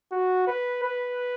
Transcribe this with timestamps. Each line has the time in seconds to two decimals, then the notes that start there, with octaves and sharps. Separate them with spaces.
0.12 F#4
0.47 B4
0.83 B4